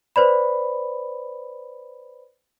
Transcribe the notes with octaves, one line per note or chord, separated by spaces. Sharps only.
B4 C5 D5 B5